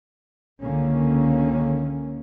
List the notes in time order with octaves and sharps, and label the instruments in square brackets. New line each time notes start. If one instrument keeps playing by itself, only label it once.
[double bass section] C#2 D3 D#3 A#3 C#4